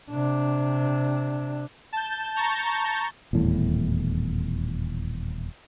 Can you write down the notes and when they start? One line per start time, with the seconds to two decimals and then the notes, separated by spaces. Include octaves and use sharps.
0.11 C3 D4
1.93 A5 G6
2.35 A5 A#5 C#6 G6 A6
3.33 D#1 E2 A2